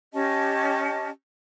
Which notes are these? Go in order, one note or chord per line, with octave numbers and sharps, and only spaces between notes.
C#4 G4 D#5 A5